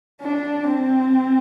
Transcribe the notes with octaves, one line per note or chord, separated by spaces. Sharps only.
D4
C4